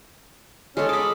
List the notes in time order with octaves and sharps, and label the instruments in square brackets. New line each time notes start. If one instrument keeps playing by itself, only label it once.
[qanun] G#3 A4 [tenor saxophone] C#4
[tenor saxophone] D#5 [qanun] B5 D6